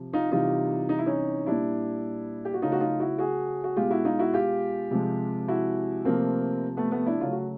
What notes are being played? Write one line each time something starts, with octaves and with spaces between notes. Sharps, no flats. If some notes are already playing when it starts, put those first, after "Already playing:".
Already playing: C3 F3
D#4 F4
C3 E3 G3 D#4 F4
D#4
E4
C#4 D#4
A#2 G3 D4 E4
G4
F#4
C#3 F#3 A3 D#4 F4
F#4
D#4 F4
E4 F#4
F#4 G#4
F#4
B2 G#3 F4 G4
E4 F#4
D#4 F4
E4 F#4
F4 G4
C3 F3 G#3
E4 F#4
C3 F3 A3 A#3 C4
A3 B3
A3 B3
D4 E4
C#3 F#3 A3 F4
F#4